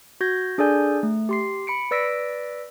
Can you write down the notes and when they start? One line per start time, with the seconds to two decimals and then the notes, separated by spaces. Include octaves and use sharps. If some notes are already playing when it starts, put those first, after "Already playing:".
0.21 F#4 G6 G#6 A#6
0.58 D4 G#4 A4 D5 G#5 G6
1.03 A3
1.29 G4 C6 C7
1.67 B5 C#7 D7
1.91 B4 D5 E6 A#6 B6 D7